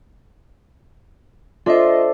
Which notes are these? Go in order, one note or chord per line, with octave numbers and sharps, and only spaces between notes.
D4 F4 A4 C5 D#5 E5